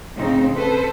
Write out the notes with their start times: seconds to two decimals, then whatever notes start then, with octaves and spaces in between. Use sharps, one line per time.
0.15 A2 C#3 F3 C4 D#4
0.54 A4 B4 C5